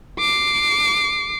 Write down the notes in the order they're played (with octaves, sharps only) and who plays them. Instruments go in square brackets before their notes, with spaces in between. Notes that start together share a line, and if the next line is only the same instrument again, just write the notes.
[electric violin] D6 C7